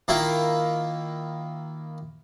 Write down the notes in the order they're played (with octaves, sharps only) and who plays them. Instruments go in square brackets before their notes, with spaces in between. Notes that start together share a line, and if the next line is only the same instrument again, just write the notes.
[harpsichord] D#3 A#3 E4 F4